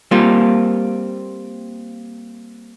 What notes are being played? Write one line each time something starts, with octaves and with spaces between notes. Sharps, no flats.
G3 A#3 C4 F4